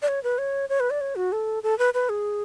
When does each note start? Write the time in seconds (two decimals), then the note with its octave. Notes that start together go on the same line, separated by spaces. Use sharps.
0.02 D5
0.08 C#5
0.23 B4
0.38 C#5
0.69 C#5
0.80 B4
0.90 D5
1.01 C#5
1.16 F#4
1.32 A4
1.63 A4
1.78 B4
1.94 B4
2.09 G#4